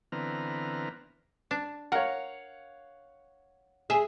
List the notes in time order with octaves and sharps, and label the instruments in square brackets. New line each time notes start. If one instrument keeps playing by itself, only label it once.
[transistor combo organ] D3 E3 B3 C4 A#5 F6
[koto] D4
[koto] A#4 [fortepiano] C#5 F5 F#5
[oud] G#4 [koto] E5